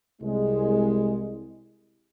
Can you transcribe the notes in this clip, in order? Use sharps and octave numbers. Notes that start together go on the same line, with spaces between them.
C2 G#3